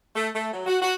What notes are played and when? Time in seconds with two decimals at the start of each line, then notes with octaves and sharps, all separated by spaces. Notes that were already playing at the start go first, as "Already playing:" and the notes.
0.15 A3
0.34 A3
0.53 F#3
0.66 F#4
0.81 F#4